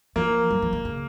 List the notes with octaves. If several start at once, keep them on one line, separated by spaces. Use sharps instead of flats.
F3 A#3
G3
F3
D#3
C#3